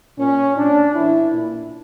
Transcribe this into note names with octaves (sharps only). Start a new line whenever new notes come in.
A#2 C#4
A#2 D4
A2 E3 E4
A#2